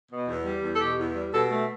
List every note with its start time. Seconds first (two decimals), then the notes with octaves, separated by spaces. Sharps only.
0.11 B2
0.28 E2
0.45 G3
0.63 E2
0.76 A4
0.80 B2 G4
0.98 E2
1.15 G3
1.33 B2 A4
1.50 A3